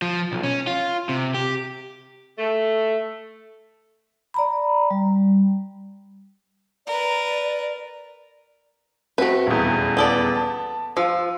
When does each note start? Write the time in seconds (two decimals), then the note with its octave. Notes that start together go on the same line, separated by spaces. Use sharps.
0.02 F3
0.32 B1
0.44 C#4
0.67 F4
1.09 C3
1.34 G4
2.37 A3
4.34 D5 A#5 B5
4.90 G3
6.87 A#4 B4 D5
9.18 A3 C4 F#4 B4
9.46 D#1 E2
9.97 B3 A4 D5
10.35 A5
10.97 F3 F4 E6